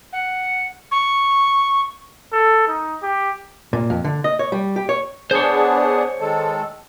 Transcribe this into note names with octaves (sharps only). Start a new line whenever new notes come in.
F#5
C#6
A4
D#4
G4
A#2
F2
D3
D#5
C#5
G3
G4
C#5
B3 D4 G#4 C5 C#5
D#3 G#3 A4